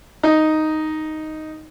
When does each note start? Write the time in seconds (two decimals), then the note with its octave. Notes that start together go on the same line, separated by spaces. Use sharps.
0.23 D#4